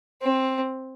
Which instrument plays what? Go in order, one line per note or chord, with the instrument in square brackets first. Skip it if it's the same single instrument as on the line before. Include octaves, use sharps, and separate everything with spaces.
[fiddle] C4